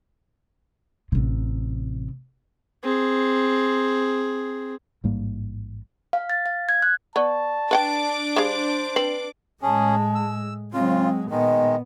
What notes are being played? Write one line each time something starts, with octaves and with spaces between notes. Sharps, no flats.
A1 C3
C4 G#4
A1 G#2 G3 A#3
F5
A6
F5
G#6
F#6
B3 D5 A5 C#6
D4 B4 F#5 G5 D6
G3 G#4 C5 F5
C4 B4 C7 F#7
A2 G#3 C#4 G#4 A5
E6
C#3 F#3 G#3 C4 F4
A#2 D#3 G#3 B3 D#5